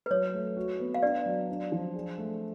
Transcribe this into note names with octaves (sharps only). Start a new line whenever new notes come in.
B4
F#3 C#5
A3
F#4
B3
F5
D4 D5
F#3
D4
F3
G#4
A3